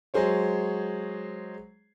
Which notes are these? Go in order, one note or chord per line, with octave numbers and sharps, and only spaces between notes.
F#3 G#3 G#4 C5 C#5